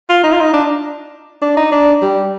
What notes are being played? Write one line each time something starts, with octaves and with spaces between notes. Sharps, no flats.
F4
D#4
F4
D#4
D4
D4
D#4
D4
G3